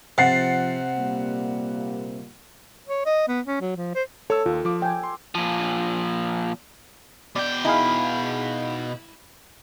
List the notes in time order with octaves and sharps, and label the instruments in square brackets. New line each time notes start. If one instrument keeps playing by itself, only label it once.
[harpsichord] C3 [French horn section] F3 [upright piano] F#5 A6 C7
[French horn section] A#2 G3 A#3
[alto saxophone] C#5
D#5
B3
C#4
F#3
F3
C5
[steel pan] A4 [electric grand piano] C#5 A5 E6
[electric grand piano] D#2 [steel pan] F4
[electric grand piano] F3 D6
[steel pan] G5 G#5
[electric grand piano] C6
[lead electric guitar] A#2 F3
[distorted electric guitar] B2 G5 [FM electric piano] D5
[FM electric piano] D#4 G#4 F5 [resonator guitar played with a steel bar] E4